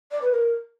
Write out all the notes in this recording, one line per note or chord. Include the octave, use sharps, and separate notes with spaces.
D5
B4
A#4